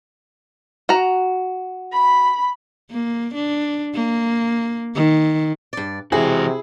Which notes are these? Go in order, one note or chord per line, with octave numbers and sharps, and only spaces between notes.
F#4 A#5
B5
A#3
D4
A#3
D#3
G2 D5
C3 E3 E4 F#4 G#4